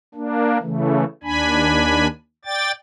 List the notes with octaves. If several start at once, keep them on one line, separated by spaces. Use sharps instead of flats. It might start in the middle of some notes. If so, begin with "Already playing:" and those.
A#3 D4
C#3 E3 A3
D#2 D4 G#5 B5
D5 G5 A6